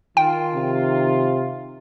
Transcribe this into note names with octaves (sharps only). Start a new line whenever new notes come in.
D#3 F4 G5
C3